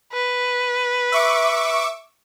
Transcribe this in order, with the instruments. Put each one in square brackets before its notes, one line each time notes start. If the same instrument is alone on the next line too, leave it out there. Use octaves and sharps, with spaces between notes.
[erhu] B4
[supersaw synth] E5 C#6 D6